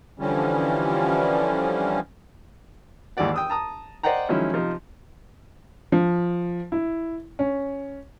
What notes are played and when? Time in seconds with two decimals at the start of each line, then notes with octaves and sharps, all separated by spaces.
0.19 D3 E3 F3 G3 C#4
3.17 G#1 D#2 E3 G4 D5 F#5
3.34 G5 D#6 E6
3.50 A5 A#5 D#6
4.03 C5 D5 D#5 F#5 G5 A#5
4.29 D#3 F3 F#3 G#3 C#4 E4
4.53 C3 F3 D#4 F4
5.92 F3
6.72 E4
7.39 C#4